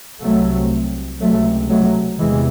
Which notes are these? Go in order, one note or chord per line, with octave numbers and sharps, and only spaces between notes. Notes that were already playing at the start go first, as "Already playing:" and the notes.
C2 C3 F#3 A3
C#2 C3 F#3 A3
F#3 A3
E2 C3 E3 G#3